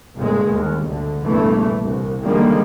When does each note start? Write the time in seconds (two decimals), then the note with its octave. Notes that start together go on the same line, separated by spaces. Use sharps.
0.15 G1 C2 G2 A#2 G#3
0.50 D#2
0.85 D2 D3
1.20 F1 A#1 E2 G2 E3 A3
1.82 C2
2.22 D3 D#3 F3 G3 G#3 A#3